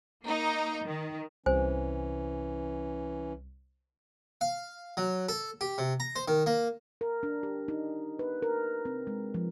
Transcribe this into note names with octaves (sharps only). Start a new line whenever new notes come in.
A#3 D#4
D#3
C2 E3 C#4 C5 G#5
F5
F#3
A4
G4
C3
A#5
C5
D#3
A#3
A#4
D4
G4
D#4
B4
A#4
C4
G#3
F3